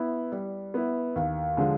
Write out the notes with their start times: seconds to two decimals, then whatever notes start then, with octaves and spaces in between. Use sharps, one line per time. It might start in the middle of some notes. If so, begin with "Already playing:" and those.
Already playing: B3 E4
0.32 G3
0.74 B3 E4
1.16 D#2
1.57 D3 F3 G#3